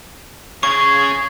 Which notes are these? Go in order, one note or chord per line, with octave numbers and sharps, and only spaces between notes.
C#3 G#4 C#6